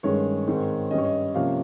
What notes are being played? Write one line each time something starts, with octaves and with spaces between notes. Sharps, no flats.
G2 D#3 G#3 C#4 C#5
G#2 D#3 G#3 C4
G2 G3 C#4 C#5 D#5
D#5
C3 F3 A#3 C#4 F5